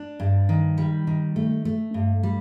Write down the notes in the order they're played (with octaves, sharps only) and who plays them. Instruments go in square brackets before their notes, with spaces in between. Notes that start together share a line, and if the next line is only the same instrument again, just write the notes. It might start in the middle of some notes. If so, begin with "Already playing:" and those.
Already playing: [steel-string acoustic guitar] D4
G2
D#3
G3
D#3
A3
A3
G2
G3